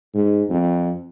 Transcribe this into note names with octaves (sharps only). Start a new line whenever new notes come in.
G#2
F2